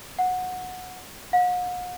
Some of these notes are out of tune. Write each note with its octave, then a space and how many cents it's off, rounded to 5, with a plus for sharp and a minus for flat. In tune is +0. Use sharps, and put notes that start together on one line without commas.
F#5 -15
F#5 -45